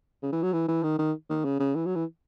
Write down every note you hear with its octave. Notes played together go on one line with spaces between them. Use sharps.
C#3
E3
F#3
E3
E3
D#3
D#3
D#3
C#3
C#3
E3
F#3
E3